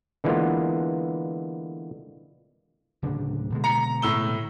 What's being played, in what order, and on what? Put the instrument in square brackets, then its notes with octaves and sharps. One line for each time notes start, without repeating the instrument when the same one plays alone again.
[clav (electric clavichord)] D3 E3 G#3 A#3 B3 F4
[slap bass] D1 C#3 D4
B2 D3 G#3
[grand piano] A#5 C#7
A2 E6 G7